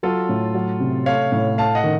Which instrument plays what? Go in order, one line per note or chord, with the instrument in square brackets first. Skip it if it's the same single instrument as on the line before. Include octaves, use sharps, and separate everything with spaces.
[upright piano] F#3 [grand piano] F4 A4
[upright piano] A2
F#3
C3
[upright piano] A3 [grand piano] C#5 F5
[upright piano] A2
[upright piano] A3 [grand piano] F5 A5
[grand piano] D#5 F#5
[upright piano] D#3